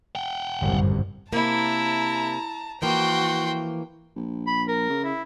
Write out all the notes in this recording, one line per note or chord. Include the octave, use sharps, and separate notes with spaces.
F#5 G5
G1 C2 F#2 A2 C#3
C3 A#3 E4 A5 A#5
E3 F3 A#3 F#4 G5 C6
A#1
B5
A#4
C#3
E4